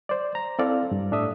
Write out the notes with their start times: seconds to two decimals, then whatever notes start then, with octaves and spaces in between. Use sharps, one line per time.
0.09 C5 D5
0.35 A#5
0.59 C4 E4 A4 D5 F5
0.91 G2
1.12 A2 D4 A4 E5 D#6